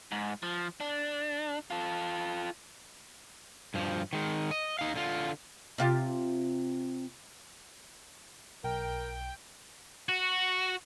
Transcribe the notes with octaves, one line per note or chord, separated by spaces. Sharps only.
G#2
F3
D4
F4 A4
G2 F3
D#3 G#3
D#5
D#4 F5
D3 F4
C3 F4 G4
B1 A#4 G5
F#4